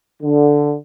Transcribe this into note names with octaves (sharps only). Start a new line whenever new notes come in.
D3